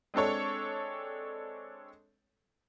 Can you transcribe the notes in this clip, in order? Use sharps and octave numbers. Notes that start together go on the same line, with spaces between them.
G#3 C4 D4 A4 C#5